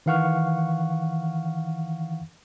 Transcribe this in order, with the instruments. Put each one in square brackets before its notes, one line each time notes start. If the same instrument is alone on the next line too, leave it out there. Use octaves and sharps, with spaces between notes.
[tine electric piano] D#3 E3 F5 F#5 C#6 F6